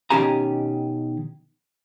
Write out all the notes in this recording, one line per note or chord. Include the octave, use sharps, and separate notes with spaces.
B2 D#3 C#4 G4 G#5 A#5